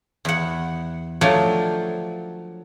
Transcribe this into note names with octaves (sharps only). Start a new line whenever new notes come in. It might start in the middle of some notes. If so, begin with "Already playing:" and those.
E2 F#5
F3 F#3 A3 D4